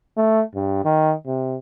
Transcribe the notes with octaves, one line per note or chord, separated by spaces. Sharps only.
A3
G2
D#3
C3